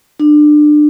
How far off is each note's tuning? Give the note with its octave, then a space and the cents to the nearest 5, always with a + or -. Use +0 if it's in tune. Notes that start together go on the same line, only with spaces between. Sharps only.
D4 +25